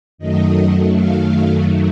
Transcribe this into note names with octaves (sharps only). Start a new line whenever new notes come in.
F#2 D#3 F#3 A3 D#5
F5